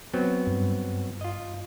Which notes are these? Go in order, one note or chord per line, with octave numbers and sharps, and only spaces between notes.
F#3 B3 C4
G2
F4 D#5